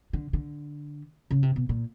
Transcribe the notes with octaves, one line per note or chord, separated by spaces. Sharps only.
D3
D3
C#3
C3
B2
A#2